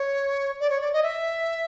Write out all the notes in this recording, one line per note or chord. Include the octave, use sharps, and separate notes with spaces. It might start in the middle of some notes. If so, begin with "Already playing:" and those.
Already playing: C#5
D5
C#5
D5
D#5
E5